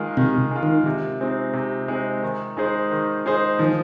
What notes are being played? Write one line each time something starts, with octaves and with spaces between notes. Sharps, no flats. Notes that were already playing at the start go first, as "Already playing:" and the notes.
Already playing: D#3 G#3 F4
C3 D#3
G#3 F4
D#3
C3
G#3 C4 D#4
C3
G#3 C4 D#4
D#3
G#3 D#4 G#4 C5
D#3
G#3 D#4 G#4 C5
D#3 F3